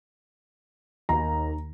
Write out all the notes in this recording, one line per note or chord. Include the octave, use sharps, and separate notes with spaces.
D#2 A#5